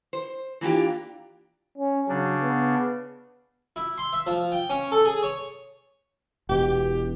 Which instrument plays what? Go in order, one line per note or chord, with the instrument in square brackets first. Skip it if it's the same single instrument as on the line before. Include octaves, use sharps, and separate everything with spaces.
[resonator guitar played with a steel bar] C5
E3 A#3 D4 F4 G4
[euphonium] C#4
[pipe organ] C#3 D4 [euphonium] F#3
[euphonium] B3
[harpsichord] E4
C6
E5
F3
G5
C#4
A4
G#4
C#5
[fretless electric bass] E1 B2 [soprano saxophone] G4